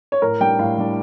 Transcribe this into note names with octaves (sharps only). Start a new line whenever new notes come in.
C#5
A2 A#4
G3 D4 G5
A2 F5
G3 D4